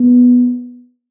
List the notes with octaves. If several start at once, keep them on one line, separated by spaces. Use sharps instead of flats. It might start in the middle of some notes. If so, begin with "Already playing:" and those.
Already playing: B3